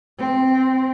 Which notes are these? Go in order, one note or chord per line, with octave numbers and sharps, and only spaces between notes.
C4